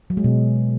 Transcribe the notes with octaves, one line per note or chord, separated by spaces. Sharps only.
F#3
G#3
B2